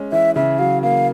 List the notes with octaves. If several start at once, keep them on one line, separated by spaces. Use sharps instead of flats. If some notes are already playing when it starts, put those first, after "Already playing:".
Already playing: G#3 C#4
E3 E5
C#3 E5
F#3 F5
A#3 F5